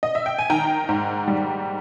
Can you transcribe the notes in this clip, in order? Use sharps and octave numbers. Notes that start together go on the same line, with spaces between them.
D#5
E5
G5
G#5
D#3 G5 A#5
G#2
G3